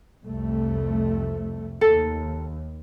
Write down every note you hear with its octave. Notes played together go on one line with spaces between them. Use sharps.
C2 F2 A3
D#2 A4